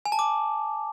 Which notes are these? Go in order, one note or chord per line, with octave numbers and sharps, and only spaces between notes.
G#5
A5
D6